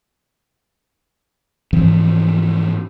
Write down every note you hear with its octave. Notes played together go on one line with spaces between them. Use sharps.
G#2 E3 F3 C4